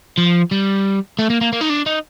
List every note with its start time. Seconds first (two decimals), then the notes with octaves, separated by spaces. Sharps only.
0.18 F3
0.51 G3
1.19 A3
1.30 A#3
1.41 A#3
1.52 A#3
1.61 D#4
1.69 D4
1.86 D#4